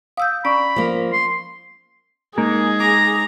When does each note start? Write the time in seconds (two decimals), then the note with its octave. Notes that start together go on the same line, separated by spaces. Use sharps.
0.17 F5 D#6 E6 G6
0.45 C#4 D5 A#5 B5 C#6
0.76 F3 A#3
1.13 C6
2.38 G#3 A#3 D#4 G#4
2.80 A#5 D6